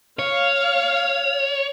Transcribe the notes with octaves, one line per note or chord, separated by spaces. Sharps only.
C#5 F5